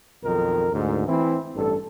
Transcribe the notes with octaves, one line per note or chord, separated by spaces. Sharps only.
B1 F2 D#3 A#4
D2 G#2
E3 C4 E4
A1 G2 A4